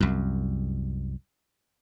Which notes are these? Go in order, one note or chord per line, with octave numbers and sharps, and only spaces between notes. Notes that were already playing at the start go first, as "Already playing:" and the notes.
C2 F#2